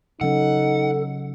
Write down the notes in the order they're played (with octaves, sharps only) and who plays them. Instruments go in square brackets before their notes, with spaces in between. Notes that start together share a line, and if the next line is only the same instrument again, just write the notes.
[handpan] C#3 F#3 C#4 [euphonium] D#4 [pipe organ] A4 [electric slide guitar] F#5